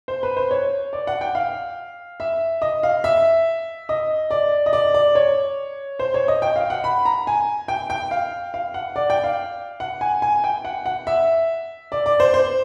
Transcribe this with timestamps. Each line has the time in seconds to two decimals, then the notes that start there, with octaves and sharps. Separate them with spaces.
0.08 C5
0.23 B4
0.37 C5
0.51 C#5
0.93 D5
1.07 F#5
1.21 G5
1.35 F5
2.20 E5
2.62 D#5
2.83 F5
3.04 E5
3.89 D#5
4.31 D5
4.66 D#5
4.73 D5
4.94 D5
5.15 C#5
5.99 C5
6.14 C#5
6.28 D#5
6.42 G5
6.56 F5
6.70 F#5
6.84 B5
7.05 A#5
7.27 G#5
7.68 G5
7.90 G5
8.11 F5
8.54 F5
8.74 F#5
8.96 D5
9.10 G5
9.24 F5
9.80 F#5
10.01 G#5
10.22 G#5
10.44 G5
10.65 F#5
10.86 F#5
11.07 E5
11.92 D5
12.06 D5
12.20 C5
12.34 C5